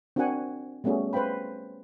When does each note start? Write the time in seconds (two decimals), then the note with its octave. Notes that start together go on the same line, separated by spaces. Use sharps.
0.16 C4 D4 F#4 A#4 F#5 G#5
0.84 G3 A3 B3 C#4 F#4 G#4
1.13 B4 C5 F5 G5 B5